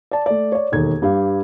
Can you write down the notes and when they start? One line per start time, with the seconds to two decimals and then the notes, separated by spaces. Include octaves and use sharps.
0.11 D5 A5
0.26 A3 D5
0.52 C#5 D5
0.72 E1 D#2 A4 G#6
1.02 G2 G4 F5